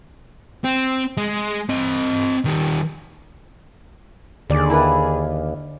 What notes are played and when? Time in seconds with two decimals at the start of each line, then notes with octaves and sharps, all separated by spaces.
0.64 C4
1.17 G#3
1.69 C4 D#5
2.45 D#3 G3
4.50 D#2 D3 G#4 D5
4.70 E4 A#4 B4